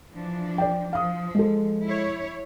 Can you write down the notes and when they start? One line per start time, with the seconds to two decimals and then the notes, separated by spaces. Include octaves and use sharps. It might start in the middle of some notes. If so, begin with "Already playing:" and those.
0.11 E3 F3 D4
0.58 D5 G5
0.93 F3 F5 D#6
1.35 G#3 A4
1.84 E4 C#5